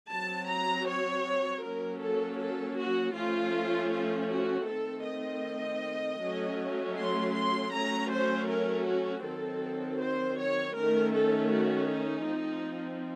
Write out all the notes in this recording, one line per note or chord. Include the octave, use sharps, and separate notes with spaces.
F#3 C4 A5
A#5
C#5
F#3 A#3 C#4 A#4
A4
A4
F#4
F3 A3 C#4 F4
F4
F#4
D#3 A3 C4 A4
D#5
F#3 A3 C#4
C6
C6
F#3 A3 C#4 A#5
C5
A#4
F#4
D#3 F#3 C4 A4
C5
C#5
D#3 A3 C#4 A#4
A4
F#4
D#4
F3 C4